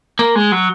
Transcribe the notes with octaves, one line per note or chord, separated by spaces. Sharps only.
A#3
G#3
F#3